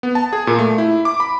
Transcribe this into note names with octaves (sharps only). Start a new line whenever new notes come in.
B3
A5
G#4
A#2
A3
E4
D6
B5